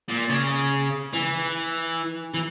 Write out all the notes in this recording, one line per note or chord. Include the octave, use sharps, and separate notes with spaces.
A#2
C#3
E3
E3